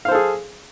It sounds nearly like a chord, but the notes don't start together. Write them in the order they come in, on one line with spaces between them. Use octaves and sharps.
F5 C5 A4 G#4